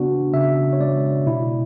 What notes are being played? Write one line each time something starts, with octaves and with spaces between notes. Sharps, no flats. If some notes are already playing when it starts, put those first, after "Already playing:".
Already playing: C#3 B3 D4 F#4
C#3 E5
C#5
G#3 D5
B2 E4